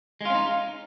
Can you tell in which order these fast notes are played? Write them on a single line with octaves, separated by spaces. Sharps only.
G#3 F4 C#4 D#4